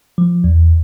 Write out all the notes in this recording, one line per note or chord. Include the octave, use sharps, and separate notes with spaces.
F3
E2